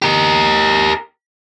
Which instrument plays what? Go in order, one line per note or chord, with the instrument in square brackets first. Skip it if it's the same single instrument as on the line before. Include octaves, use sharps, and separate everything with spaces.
[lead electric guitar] G4 A#4